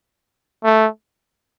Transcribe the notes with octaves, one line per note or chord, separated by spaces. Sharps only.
A3